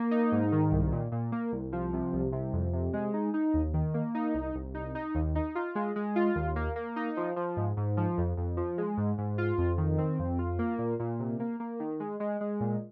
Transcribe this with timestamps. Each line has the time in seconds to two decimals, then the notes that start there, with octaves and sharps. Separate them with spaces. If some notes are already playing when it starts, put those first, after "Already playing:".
Already playing: A#3
0.11 D#4
0.32 G#2
0.52 D#3
0.72 C2
0.92 A#2
1.12 A#2
1.32 A#3
1.52 C2
1.72 F3
1.93 C3
2.13 C2
2.32 C3
2.53 F2
2.73 C3
2.93 G#3
3.14 D#4
3.34 D#4
3.54 D#2
3.74 D#3
3.94 A#3
4.15 D#4
4.34 C2
4.55 C2
4.75 D#4
4.95 D#4
5.15 D#2
5.35 D#4
5.55 F4
5.75 G#3
5.96 G#3
6.16 F4
6.35 D#2
6.56 A#3
6.76 A#3
6.96 D#4
7.17 F3
7.36 F3
7.57 G#2
7.77 G#2
7.97 F3
8.18 F2
8.37 F2
8.57 F3
8.78 G#3
8.97 G#2
9.18 G#2
9.38 F4
9.58 F2
9.78 D#3
9.98 C4
10.19 F2
10.39 F4
10.59 A#3
10.79 A#2
11.00 A#2
11.19 C3
11.40 A#3
11.60 A#3
11.80 D#3
12.00 G#3
12.20 G#3
12.41 G#3
12.60 A#2